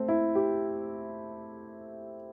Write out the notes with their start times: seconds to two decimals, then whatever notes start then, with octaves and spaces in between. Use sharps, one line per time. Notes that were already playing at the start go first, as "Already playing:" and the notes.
Already playing: A3 C4
0.08 E4
0.35 G4